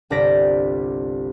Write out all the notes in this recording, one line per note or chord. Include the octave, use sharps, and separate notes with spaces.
G1 C2 F4 D5 A#6 B6